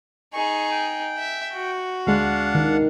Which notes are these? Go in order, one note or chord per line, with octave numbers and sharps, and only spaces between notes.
D#4 G#4 C#6
G5
E5
F#4
D2 G#3 D4 F5 F#5
D#3